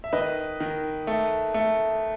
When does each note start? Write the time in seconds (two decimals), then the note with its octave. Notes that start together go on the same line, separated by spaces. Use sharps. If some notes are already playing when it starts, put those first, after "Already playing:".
0.04 E5
0.13 D#3 B4 D#5
0.60 D#3
1.07 A3
1.54 A3